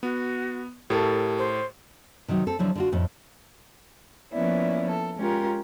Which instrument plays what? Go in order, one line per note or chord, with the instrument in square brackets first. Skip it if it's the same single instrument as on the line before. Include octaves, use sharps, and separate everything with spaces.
[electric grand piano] B3 [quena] F#4
[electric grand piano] A2 [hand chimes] G4 A#4 A5 [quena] A4
[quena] C5
[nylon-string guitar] C3 D#3 F#3 D#4
C4 A4
D3 F3 F#3 E4
D3 F4 F#4
F2 A2
[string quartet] F3 A#3 B3 C#4 E4 D5
A4
G#3 C#4 F4 G4 A#4